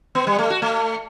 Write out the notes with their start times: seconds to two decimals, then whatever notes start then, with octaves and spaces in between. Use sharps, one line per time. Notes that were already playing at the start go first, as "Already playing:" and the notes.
0.15 B3
0.27 G3
0.38 A3
0.50 F#4
0.62 A3